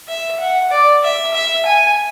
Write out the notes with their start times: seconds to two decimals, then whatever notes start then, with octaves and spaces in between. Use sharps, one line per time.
0.08 E5
0.40 F#5
0.70 D5
1.03 E5
1.34 E5
1.66 G#5